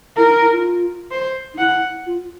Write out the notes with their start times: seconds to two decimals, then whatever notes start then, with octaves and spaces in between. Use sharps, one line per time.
0.17 E4 A#4
0.28 D#4
0.40 E4
0.52 F4
1.11 C5
1.54 D#4
1.58 E4 F#5
2.06 F4